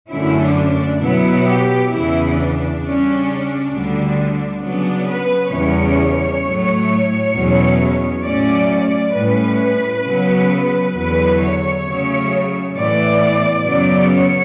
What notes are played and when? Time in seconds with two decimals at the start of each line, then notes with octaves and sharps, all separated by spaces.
0.11 F#2 D3 A3 C#4 E4
0.41 D4
0.71 D4
1.01 B2 F#3 B3 E4
1.46 G4
1.91 E2 C#3 E3 E4
2.36 D4
2.82 C#3 G3 C#4
3.72 D2 D3 G3
4.62 C#3 F#3 B3 D4
5.08 B4
5.53 E2 C#3 G3 C#4 C#5
6.44 A2 F#3 A3
7.33 E2 B2 F#3 C#4
8.24 A2 F#3 A3 C#4 D5
8.69 D5
9.14 A2 G3 C#4 B4
10.05 C#3 F#3 B3
10.95 E2 D3 F#3 B4
11.41 C#5
11.86 C#3 F#3 A3
12.76 A2 E3 B3 D5
13.66 F#2 C#3 F#3 B3 D5
14.12 C#5